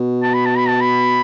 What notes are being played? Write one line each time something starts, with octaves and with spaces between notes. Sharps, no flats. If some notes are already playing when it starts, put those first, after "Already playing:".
Already playing: B2
A5
B5
A5
B5
A5
B5